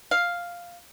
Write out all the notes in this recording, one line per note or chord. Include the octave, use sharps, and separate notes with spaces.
F5